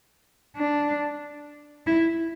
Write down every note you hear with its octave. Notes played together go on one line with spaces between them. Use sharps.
D4
E4